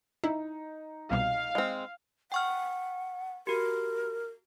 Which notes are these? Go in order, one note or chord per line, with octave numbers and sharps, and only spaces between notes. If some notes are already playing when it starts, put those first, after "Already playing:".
D#4 E4
C2 B2 G3 F5
G#3 C4
F#5 G5 C#6 F6
F#4 G4 A#4